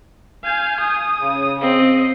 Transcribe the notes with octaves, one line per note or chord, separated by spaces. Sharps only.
F5 G#5 G6
D#6
C#3
C4 D#5